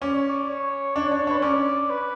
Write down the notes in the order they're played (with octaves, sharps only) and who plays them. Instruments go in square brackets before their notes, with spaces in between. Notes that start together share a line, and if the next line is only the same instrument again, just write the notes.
[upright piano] C#4 [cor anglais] D5
[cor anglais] C#5
D5
C#5
[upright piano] D4 [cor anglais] D5
[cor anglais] C#5
[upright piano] D4
[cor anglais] C#5
[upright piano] D4 [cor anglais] B4
[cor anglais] C#5
[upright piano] C#4 [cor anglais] D5
[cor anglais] B4